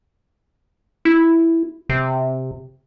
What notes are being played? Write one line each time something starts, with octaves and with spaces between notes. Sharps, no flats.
E4
C3